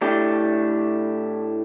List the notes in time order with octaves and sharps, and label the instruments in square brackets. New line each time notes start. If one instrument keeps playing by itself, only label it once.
[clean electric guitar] A2 A3 D4 G4